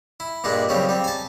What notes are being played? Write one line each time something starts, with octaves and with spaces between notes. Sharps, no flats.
E4
G2 A#2 G#3 D4
B1 C#3 F3 G3 C4
G3 C4
G#5 A5